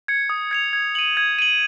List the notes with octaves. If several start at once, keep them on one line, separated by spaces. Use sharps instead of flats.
G#6 C#7
D#6
G#6 C#7 F7
G#6
D#7 F#7
G#6
D#7 F#7